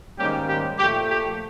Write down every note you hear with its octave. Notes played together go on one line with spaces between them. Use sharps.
G#2 D#3 G3 A#3 C#4 G4
G4
A#2 F3 A3 G4
G4